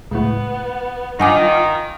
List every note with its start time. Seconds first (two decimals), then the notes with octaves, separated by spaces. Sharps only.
0.11 C#2 A2 B3
1.20 G2 D#3 F4 F#5 G#5 D6